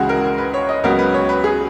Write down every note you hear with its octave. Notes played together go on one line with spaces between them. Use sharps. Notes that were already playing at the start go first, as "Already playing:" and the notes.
Already playing: C#2 C#3 E3 G#3 F#4 G#4
A#4
B4
C#5
D#5
C#2 C#3 F#3 B3 A#4
B4
C#5
B4
G#4